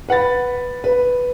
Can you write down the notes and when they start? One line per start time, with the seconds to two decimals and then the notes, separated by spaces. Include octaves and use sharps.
0.09 B4 F#5 B5 A6
0.84 B4